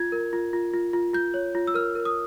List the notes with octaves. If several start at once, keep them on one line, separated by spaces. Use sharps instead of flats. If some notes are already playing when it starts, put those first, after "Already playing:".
Already playing: F4 G#6
A#4
F4
F4
F4
F4
F4 G6
C#5
F4
E6
A#4 F6
A#4
D#6